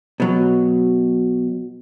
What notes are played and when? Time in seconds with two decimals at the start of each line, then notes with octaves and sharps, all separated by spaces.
0.20 B2 F#3